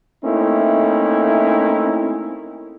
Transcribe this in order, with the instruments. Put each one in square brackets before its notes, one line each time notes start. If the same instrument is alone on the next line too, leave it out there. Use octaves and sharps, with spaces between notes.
[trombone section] A3 A#3 C4 C#4 D#4 E4